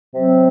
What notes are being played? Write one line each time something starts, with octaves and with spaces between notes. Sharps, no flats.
C3 F#3 C4